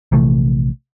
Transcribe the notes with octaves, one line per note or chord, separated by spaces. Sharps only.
A#1 C3 E3 A3